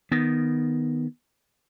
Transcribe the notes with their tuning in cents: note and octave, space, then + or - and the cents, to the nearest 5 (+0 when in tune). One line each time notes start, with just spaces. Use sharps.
D#3 +0 B3 +0